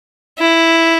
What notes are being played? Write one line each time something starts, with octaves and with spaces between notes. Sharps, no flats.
E4